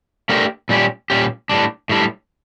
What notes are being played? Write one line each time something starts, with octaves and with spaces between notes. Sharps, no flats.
A3 D4 G4 A#4
A#2 G3 C#4 G4
A#2 G3 C#4 G4
A2 G3 D4
A2 G3 D4